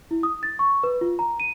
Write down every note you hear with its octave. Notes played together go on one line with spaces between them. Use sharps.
E4
D#6
A6
C#6
B4
F4
A#5
D#7